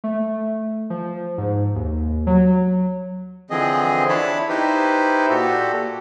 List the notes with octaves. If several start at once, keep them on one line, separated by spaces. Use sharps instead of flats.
A3
F3
G#2
D#2
F#3
D3 E3 F3 C4 G#4 D#5
D4 E4 C#5 A5 B5
D#4 E4 G4 B4 C5
A#2 F#4 G4 A4